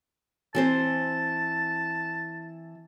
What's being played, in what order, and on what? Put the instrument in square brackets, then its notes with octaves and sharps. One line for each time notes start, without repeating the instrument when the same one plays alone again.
[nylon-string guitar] E3 C4 C5 [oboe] A5